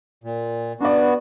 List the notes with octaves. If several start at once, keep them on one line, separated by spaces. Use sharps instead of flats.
A#2
B3 D4 F#4 D5